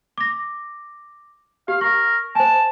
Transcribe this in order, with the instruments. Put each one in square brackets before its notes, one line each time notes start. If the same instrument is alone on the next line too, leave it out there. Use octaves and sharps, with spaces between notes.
[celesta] D6 A#6
[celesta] G4 [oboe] F5
[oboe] A#4 [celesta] C#6
[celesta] C5 G#5 [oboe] A5